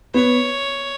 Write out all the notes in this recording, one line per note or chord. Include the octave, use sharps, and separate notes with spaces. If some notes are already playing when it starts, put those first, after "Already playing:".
B3 C#5